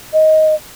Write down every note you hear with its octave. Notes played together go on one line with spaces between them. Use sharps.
D#5